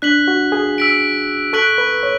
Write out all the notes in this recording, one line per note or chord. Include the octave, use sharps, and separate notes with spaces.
D4 F#6 B6 F#7
F#4
G#4
E6 B6 D7
A4 C#6 F#6 B6 D7 F#7
B4
C#5